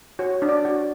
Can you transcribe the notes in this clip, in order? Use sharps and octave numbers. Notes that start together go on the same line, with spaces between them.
F#4 C#5
D4
D5
F#4